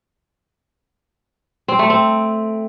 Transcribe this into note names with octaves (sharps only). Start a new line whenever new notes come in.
C4
A3
C4